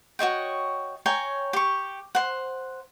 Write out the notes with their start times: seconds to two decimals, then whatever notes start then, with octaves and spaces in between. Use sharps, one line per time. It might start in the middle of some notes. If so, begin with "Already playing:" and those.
0.19 F#4 C#5 D#5 G5
1.06 C#5 G5 G#5 A#5
1.53 G4 C#6
2.15 C5 F#5